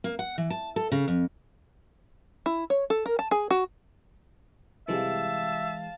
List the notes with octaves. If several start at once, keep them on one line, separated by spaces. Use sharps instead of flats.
A#3
F#5
E3
A5
A4
C#3
F2
E4
C#5
A4
A#4
A5
G#4
F#4
C3 E3 G3 G#3 G4 E5 F5 A5